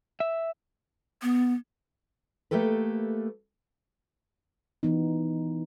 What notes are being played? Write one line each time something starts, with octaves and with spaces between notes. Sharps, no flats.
E5
B3
A3 A#3 G4 A4 B4
E3 B3 D#4